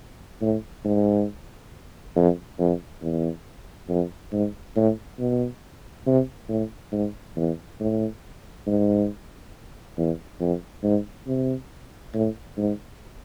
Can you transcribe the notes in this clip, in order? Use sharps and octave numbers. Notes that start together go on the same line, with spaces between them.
A2
G#2
F2
F2
E2
F2
G#2
A2
B2
C3
A2
G#2
E2
A2
G#2
E2
F2
G#2
C3
A2
G#2